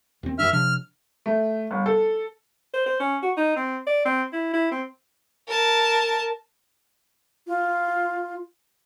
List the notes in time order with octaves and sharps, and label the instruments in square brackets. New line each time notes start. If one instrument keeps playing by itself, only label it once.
[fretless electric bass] D#2 C4
[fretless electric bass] F#2 A#2 D4 [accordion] E5 F6
[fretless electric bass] C3 F3 D4 [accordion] F6
[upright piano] A3
G1
A4
[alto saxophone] C5
C5
C#4
F#4
D#4
C4
D5
C4
E4
E4
C4
[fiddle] A#4 A5
[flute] F4